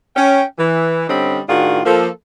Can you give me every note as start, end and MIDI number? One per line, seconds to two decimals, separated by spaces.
0.16 0.43 61
0.16 0.43 79
0.59 1.06 52
1.09 1.40 50
1.09 1.40 55
1.09 1.40 60
1.09 1.40 61
1.09 1.40 75
1.09 1.40 83
1.49 1.80 45
1.49 1.80 51
1.49 1.80 62
1.49 1.80 65
1.49 1.80 66
1.49 1.80 68
1.85 2.08 53
1.85 2.08 58
1.85 2.08 69